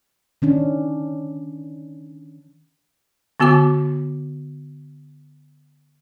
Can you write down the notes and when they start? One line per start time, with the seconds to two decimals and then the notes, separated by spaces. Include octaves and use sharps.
0.42 D#3 C#4 D4
3.40 D3 B3 F#4 G#5 D6